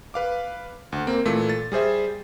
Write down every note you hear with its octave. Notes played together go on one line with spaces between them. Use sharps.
B4 F5 D6
D2
A#3 C4
A#2 E3 A3
A6
G3 G#4 C5 E5